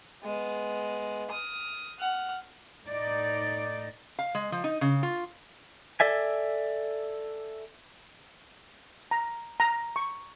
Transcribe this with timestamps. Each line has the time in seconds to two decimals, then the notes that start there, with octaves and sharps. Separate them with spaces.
0.24 G#3 B3
1.31 D#6 F6
1.99 F#5 F6
2.85 A2 D#4 D5
4.19 F5
4.35 G#3
4.52 F3
4.64 D#4
4.81 C#3
5.03 F4
6.00 A4 D5 E5 G#5
9.11 A#5
9.60 A#5
9.96 C#6